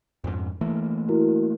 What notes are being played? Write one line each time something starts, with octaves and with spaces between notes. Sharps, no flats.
F2 G#2
E3 A3 A#3
E4 F#4 A#4